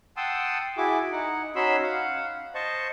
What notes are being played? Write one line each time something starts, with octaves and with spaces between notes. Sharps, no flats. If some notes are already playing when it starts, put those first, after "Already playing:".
F#5 G5 A5 C6 D#6 E6
E4 F#4 G#4 D6
D#4 F#5
C#4 D#4 F#4 B5 C6 E6
F5 F#5
C5 D#5 A5 C#6